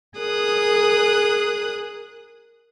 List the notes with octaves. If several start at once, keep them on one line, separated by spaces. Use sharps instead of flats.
G#4 A#4 D#6 F#6